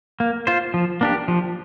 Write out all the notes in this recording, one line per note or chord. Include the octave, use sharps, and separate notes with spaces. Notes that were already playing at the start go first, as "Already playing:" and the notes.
A#3
F4 C5
F3
A#3 D4 G4
F3